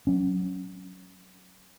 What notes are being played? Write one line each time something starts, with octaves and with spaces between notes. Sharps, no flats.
F#3 C#4